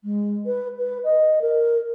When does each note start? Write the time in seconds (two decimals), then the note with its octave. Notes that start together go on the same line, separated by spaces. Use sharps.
0.04 G#3
0.46 B4
0.78 B4
1.04 D#5
1.41 A#4